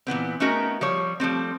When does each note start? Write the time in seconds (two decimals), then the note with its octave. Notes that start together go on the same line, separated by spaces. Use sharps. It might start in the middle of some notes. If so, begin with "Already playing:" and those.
0.07 A#2 E3 B3 C4
0.40 A3 B3 C#4 D#4 F#4 A#4
0.81 F3 G3 C#5
1.20 F3 G3 A3 C4